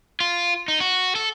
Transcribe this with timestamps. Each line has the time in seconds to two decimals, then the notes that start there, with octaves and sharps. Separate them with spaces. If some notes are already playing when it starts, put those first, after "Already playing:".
0.20 F4
0.68 D#4
0.80 F#4
1.15 A4